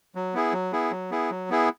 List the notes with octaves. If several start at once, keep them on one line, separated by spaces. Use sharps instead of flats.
F#3
B3 E4 G#4
F#3
B3 E4 G#4
F#3
B3 E4 G#4
F#3
B3 E4 G#4